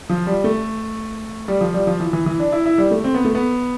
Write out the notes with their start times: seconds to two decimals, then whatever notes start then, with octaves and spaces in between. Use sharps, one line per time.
0.10 F3
0.27 G3
0.44 A3
1.48 G3
1.61 F3
1.74 G3
1.87 F3
2.00 E3
2.13 E3
2.26 E3
2.39 D4
2.52 E4
2.66 E4
2.78 G3
2.91 A3
3.04 C4
3.14 B3
3.25 A3
3.35 B3